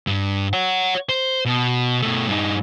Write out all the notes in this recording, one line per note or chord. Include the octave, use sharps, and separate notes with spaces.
G2
C#5 F#5
C5
B2
B2 A3
G2 D#4